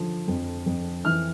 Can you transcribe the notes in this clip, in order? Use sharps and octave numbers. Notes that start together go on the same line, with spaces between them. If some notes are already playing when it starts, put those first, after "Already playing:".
Already playing: D3 F3
F2
F2
E3 F6